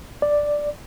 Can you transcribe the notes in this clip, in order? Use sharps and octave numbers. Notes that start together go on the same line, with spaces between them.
D5